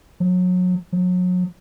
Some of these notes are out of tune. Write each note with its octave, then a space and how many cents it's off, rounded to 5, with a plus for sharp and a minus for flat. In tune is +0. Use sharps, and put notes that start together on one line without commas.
F#3 -30
F#3 -35